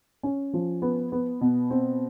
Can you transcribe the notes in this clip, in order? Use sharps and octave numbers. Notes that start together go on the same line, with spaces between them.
C#4
F3
B3
B3
B2
C4